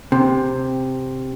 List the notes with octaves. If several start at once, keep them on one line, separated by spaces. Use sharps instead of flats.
C3